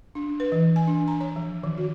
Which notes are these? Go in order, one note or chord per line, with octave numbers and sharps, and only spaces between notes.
D4
B4
E3
G#5
D4
A#5
C#5
F3
D#3
F#4